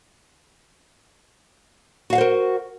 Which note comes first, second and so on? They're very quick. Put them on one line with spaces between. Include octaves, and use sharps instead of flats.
F#4 F5 F#5 C5 A#4